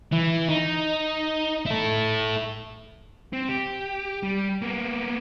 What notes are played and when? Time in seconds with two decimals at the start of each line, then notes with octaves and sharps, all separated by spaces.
0.12 E3
0.49 D#4
1.66 E4 A4
3.33 C4
3.49 G4
4.23 G3
4.62 A#3 B3